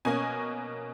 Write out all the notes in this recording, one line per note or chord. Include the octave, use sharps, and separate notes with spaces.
B2 A#3 C#4 G#5